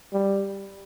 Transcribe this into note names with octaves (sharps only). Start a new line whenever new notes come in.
G3